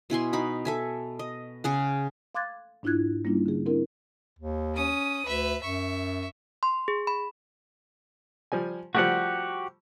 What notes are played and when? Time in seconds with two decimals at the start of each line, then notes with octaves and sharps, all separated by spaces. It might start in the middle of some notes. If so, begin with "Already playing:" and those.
0.10 B2 E4 G#5 C6
0.33 D#4 F#4 B5
0.65 A4 E5 G#5
1.19 D#5
1.64 C#3 G#4 F#5
2.35 F5 C6 D6 F#6 G#6 A6
2.83 G#2 D4 E4 F4 F#6 G#6
3.25 G3 A#3 C#4 D4 E4 F4
3.46 D3 G#4
3.66 C4 D4 E4 A#4
4.39 D#2
4.75 C#4 D#6
5.25 D2 B4 E5
5.62 F#2 E5 C#6
6.63 C6
6.88 G#4
7.07 B5
8.52 F3 G3 G#5
8.95 F3 G3 A3 F#4 G4 F#5